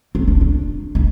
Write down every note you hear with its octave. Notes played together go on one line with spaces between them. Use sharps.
C4
D4
D4
D#4